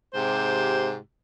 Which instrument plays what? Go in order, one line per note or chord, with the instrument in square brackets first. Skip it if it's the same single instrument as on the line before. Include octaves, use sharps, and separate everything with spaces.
[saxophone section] G#2 C3 G4 C5